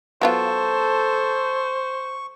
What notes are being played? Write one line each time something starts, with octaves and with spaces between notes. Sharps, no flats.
F#3 B3 F4 A4 C5 C#6